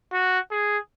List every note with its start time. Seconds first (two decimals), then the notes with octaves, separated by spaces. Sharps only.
0.12 F#4
0.51 G#4